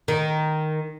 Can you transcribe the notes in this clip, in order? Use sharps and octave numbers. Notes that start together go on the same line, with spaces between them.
D#3